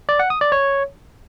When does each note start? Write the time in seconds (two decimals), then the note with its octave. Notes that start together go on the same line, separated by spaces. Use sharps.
0.09 D5
0.19 F#5
0.30 D#6
0.41 D5
0.52 C#5